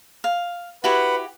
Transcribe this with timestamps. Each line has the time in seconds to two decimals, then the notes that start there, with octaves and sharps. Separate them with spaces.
0.24 F5
0.84 E4 F#4 G4 B4 F#5